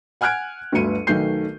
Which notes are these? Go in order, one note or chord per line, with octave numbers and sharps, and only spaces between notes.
F#5 G#5 F6 F#6 G#6 D7
G1 D2 F#3 B4 C#7 D#7
B1 D#3 A3 B4 G6 C7